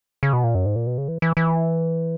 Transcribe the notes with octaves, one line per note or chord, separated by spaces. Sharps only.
C#3
B2
A#2
F#2
G#2
A#2
B2
C#3
E3
E3
E3